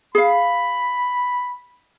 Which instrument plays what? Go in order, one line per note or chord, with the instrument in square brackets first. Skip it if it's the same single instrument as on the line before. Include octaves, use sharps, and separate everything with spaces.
[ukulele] G#4 F5 [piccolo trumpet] B5